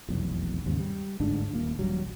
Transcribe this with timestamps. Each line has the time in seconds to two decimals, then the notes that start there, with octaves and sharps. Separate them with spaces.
0.08 F1 B1 E2
0.66 D#2 G#2 C#3
0.79 G3
1.20 G1 D2 G#2 D4
1.53 D#1 A#3
1.79 D#1 A#1 F#3 G3